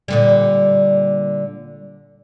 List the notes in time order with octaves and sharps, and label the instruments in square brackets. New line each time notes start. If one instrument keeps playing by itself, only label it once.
[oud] A#2 D3 G3